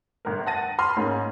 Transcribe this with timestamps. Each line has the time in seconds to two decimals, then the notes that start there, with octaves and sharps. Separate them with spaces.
0.25 G1 A#4
0.46 F#5 A5 A6 A#6 D#7
0.78 B5 C6 F6
0.96 G#2 A#3 C#4